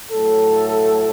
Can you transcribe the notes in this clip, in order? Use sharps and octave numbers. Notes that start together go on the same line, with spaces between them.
A2 F#3 A3 A4